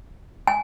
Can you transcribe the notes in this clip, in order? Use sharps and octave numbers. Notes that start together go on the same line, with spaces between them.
G#5